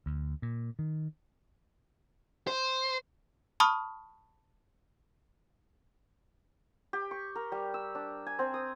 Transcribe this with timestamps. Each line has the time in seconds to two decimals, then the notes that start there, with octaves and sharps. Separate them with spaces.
0.06 D2
0.42 A#2
0.79 D#3
2.47 C5
3.60 A5 B5 C#6 D#6 F6
6.93 G4
7.11 C#6
7.36 A#4
7.52 G3
7.74 E6
7.95 D4
8.26 G#5
8.39 C4
8.54 D#6